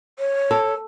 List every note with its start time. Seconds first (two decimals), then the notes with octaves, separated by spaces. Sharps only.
0.19 C#5
0.51 A4